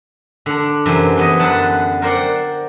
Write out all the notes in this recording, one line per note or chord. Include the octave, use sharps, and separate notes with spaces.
D3 D4
F#2 C3 E3
E3 B3 D#5
F#2 D3 F#5 A5
A#4 C5 D5 F#5 G5